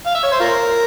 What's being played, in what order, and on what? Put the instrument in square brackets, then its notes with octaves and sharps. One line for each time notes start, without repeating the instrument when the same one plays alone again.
[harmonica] F5
E5
C#5
C5
F4 A#4